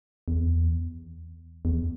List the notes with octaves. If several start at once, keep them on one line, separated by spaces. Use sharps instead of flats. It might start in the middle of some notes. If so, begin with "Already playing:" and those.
E2
E2